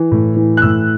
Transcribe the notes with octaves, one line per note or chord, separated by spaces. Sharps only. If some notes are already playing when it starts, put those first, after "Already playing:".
Already playing: E3
A2
E3
F#6
A2 E6